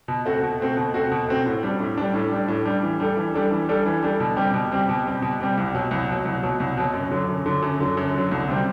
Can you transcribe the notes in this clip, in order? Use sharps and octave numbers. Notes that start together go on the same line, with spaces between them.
B2
A3 C4 F#4
B2
A3 C4 F#4
B2
A3 C4 F#4
B2
A3 C4 F#4
A2
G3 D4
A2
G3 D4
A2
G3 D4
A2
G3 D4
E3
G3 D4 A4
E3
G3 D4 A4
E3
G3 D4 A4
E3
G3 D4 A4
B2
G3 C4 G4
B2
G3 C4 G4
B2
G3 C4 G4
B2
G3 C4 G4
C2
B2 F#3
C2
B2 F#3
C2
B2 F#3
C2
B2 F#3
F#2
D3 F#3
F#2
D3 F#3
F#2
D3 F#3
F#2
D3 F#3
C2
C3 G3 C4